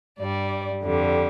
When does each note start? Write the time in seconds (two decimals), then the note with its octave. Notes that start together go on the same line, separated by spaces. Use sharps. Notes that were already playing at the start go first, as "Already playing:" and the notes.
0.18 G2 G3 D5
0.83 F2 D3 G3